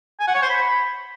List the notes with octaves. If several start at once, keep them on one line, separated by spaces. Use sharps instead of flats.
G#5
F#5
C#5
C5
B5